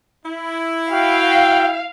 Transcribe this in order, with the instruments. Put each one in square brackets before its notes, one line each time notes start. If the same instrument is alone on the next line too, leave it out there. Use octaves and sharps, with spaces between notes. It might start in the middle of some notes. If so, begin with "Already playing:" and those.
[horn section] E4
[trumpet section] F#4 G5 [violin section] F5